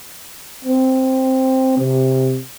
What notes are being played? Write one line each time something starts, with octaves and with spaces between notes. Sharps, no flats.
C4
C3